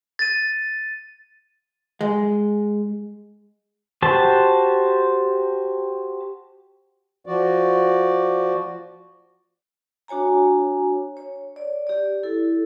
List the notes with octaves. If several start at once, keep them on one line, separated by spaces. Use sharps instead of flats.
A6 D#7
G#3
F#4 G4 C5 A5
F3 F#4 D5
D4 F#4 C#5 G#5 A#5
C#5
D5
G4 D5
E4 A4